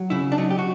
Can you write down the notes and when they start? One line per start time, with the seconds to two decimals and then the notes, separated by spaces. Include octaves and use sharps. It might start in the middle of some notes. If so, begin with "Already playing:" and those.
Already playing: F#3
0.10 C#3 E4
0.32 D4
0.38 F#3 D#4
0.50 G4
0.58 F#4